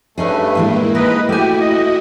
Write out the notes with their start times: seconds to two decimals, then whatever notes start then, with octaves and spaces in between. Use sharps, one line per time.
0.18 G2 A3 C#4 D#4 G#4 B4
0.55 A2 E3 G#3 A#3 E4
0.95 G#2 A#4 B4 D#5
1.29 A3 E4 F#4 G4 G#5
1.61 D#5